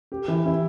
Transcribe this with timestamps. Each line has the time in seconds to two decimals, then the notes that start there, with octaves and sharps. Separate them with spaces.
0.12 G4
0.28 E3
0.46 E4